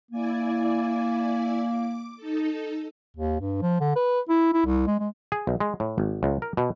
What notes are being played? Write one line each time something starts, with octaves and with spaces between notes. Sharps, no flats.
A#3 E4 D5 G#5
D6
D#4 A4
D#2
G2
F3
D3
B4
E4
E4
C2
G#3
G#3
G#4
B1
G#3
A2
G#1
C#2
A#4
B2